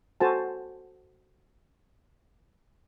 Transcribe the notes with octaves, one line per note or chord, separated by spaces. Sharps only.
F#4 A4 C5 G#5 A5